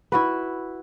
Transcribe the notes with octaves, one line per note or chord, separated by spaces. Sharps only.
E4 F#4 B4